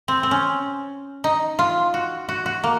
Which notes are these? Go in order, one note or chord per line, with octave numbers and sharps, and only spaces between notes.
C4
C4
C#4
D#4
F4
F#4
F#4
F#4
A#3